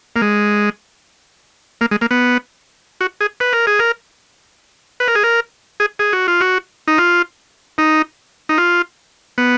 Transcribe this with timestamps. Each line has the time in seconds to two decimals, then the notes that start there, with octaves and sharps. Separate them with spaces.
0.16 A#3
0.22 G#3
1.81 A#3
1.91 G#3
2.01 A#3
2.11 B3
3.01 F#4
3.21 G#4
3.40 B4
3.53 A#4
3.67 G#4
3.79 A#4
5.00 B4
5.08 A#4
5.15 G#4
5.23 A#4
5.80 G#4
5.99 G#4
6.13 F#4
6.28 F4
6.41 F#4
6.88 D#4
6.98 F4
7.78 D#4
8.49 D#4
8.58 F4
9.38 B3